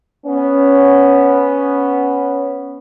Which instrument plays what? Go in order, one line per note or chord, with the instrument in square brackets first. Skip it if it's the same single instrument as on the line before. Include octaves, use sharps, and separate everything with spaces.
[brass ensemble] B3 C#4